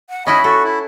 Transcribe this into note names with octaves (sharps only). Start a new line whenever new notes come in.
F#5
C#4 E4 F#4 D#5 B5
F#4 A4
E4